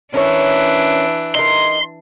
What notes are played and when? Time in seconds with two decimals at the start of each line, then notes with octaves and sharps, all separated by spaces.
0.14 E3 C#4 D4 A#4 C#5
1.35 D#4 A#4 C6